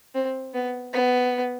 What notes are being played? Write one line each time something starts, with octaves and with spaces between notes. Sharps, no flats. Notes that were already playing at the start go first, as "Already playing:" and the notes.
C4
B3
B3